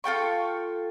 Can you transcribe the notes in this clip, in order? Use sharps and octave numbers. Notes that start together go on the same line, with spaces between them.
F4 A4 G5 C#6